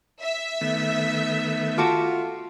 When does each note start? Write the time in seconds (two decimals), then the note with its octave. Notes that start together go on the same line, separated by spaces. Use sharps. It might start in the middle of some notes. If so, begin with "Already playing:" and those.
0.21 E5
0.61 D#3 A3 B3
1.78 F4 F#4 A4 D6